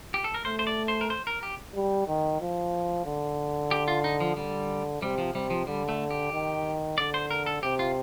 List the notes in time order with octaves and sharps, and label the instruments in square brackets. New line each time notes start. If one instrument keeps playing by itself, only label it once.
[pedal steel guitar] G4
A4
A#4
[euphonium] A3 [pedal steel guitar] C5
[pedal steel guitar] C5
D5
C5
A#4
C5
A#4
G4
[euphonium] G3
D#3
F3
D3
[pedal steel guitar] G4
F4
D#4
F3
[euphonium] D3 [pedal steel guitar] G3
[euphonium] C3 [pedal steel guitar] G3
[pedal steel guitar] F3
[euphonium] C3 [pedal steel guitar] G3
[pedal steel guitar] F3
[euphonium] D3 [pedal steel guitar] G3
[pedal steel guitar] A3
G4
[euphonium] D#3
[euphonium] D3 [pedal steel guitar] D5
[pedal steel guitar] C5
A#4
A4
[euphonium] C3 [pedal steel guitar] G4
[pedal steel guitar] F4